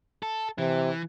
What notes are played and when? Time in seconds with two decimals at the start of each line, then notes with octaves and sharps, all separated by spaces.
0.23 A4
0.59 C3 E3